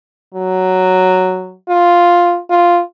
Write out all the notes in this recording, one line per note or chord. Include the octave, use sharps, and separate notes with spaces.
F#3
F4
F4